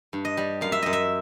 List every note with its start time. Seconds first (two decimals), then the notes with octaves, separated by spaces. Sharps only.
0.13 G2
0.25 D#5
0.37 G3
0.61 F#2 F5
0.72 E5
0.83 F#2 D#5
0.93 E5